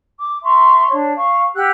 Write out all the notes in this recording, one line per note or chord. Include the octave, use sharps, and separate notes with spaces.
D6
E5 A#5 C6 C#6
D4 C#5
F5 C#6
G4 F#5 E6 F#6